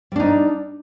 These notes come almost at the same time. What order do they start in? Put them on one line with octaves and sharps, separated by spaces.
G3 D4 D#4